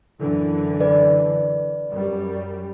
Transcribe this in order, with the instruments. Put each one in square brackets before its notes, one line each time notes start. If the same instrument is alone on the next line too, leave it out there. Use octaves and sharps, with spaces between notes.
[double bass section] F#2 D3 E3
[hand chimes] B4 D5
[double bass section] F#2 G3